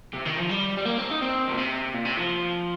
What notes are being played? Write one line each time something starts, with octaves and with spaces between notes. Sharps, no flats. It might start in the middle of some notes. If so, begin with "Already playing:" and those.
C3
D#3
F3
G3
G3
A#3
C4
D#4
C4
A#2
C3
A#2
C3
F3